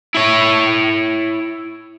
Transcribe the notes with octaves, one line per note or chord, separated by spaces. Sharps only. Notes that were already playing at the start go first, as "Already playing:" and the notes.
E4 C#5